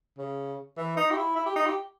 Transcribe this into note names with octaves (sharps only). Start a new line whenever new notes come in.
C#3
E3
D#4
G4
E4
E4
G4
D#4
G4